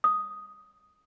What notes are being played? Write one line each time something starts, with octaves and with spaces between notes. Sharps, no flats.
D#6